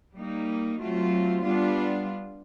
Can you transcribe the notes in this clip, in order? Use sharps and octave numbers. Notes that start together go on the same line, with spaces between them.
G3 A#3 D#4
F#3 A3 C4 F4
G3 B3 D4 F4